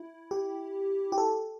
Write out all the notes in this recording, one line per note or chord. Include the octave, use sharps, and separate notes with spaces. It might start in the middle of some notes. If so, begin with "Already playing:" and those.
Already playing: E4
G4
G4
A4